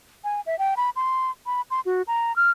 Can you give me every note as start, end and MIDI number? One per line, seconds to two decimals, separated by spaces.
0.24 0.41 80
0.46 0.58 76
0.59 0.74 79
0.77 0.90 83
0.96 1.31 84
1.46 1.61 83
1.71 1.80 84
1.86 2.02 66
2.07 2.35 82
2.36 2.51 89